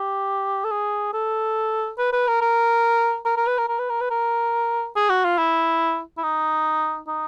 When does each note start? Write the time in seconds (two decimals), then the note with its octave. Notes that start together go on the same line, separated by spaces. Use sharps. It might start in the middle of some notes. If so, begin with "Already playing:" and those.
Already playing: G4
0.64 A4
0.71 G#4
1.13 A4
1.98 B4
2.13 B4
2.27 A#4
2.41 A#4
3.26 A#4
3.37 A#4
3.47 B4
3.58 A#4
3.69 A#4
3.79 B4
3.89 A#4
4.01 B4
4.10 A#4
4.96 G#4
5.10 F#4
5.24 F4
5.38 E4
6.18 E4
6.23 D#4
7.08 D#4